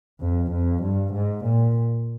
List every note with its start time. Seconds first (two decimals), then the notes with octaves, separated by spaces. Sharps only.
0.21 F2
0.51 F2
0.82 G2
1.13 G#2
1.45 A#2